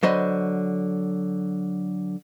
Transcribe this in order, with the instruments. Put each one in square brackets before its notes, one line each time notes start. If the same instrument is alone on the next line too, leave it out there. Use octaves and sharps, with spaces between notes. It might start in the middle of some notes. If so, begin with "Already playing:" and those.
[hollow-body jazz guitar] D3 F#3 C5 D#5 B5